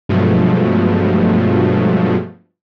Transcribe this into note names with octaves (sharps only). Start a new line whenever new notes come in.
G2 B2 F3 F#3 G#3 A3